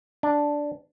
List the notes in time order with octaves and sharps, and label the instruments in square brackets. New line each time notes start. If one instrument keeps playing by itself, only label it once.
[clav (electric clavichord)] D4